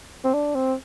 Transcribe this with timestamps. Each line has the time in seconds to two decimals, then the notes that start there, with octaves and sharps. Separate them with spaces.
0.25 C4
0.34 D4
0.55 C4